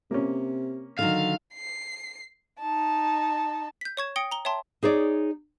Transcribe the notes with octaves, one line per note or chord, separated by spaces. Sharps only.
C3 A#3 C#4
D3 D#3 F#3 F5
C7
D#4 A5
G6 B6
C#5 C#6 G#6 E7
G5 D#6 A#6 C#7 D7 G7
A#5 G7
C#5 E5 G5 A5 C6
D#4 G#4 C#5 D5